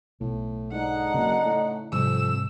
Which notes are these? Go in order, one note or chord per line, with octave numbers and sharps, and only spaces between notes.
B1 A2
G#2 D3 D#4 F#5
F#1 C#3
A2
F2 G#2 C3 G3 E6